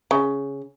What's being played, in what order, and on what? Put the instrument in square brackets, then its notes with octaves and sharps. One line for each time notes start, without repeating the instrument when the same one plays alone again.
[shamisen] C#3